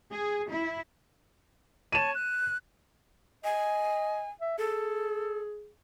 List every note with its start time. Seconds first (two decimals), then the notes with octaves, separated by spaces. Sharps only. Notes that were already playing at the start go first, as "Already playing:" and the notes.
0.10 G#4
0.49 E4
1.92 C#5 A5 D#7 E7
2.16 F#6
3.44 D#5 G#5
4.41 E5
4.59 G#4 A4